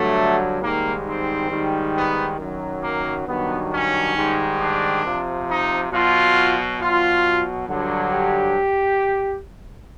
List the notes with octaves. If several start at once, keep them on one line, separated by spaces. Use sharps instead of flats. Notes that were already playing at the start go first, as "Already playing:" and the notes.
Already playing: G2 D3 F#3 A3
G#2 D#3 G3 A#3
C4
G#2 D#3 G3
B3
F#2 D#3 F#3
A#3
G2 D#3 F#3 B3
C#4
G#2 D#3 G3
D4
C3 F3
D#4
B2 F#3 F4
B2 F#3 F4
G2 D3 F#3
G4